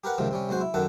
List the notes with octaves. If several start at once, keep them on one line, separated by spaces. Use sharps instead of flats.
G4 A#4 B4 F#5
C#2 G#2 C3 D#3 F3
C3 G3 C#4
B1 G#3 F#4 C5
E4
F#2 D#3 A4 F#5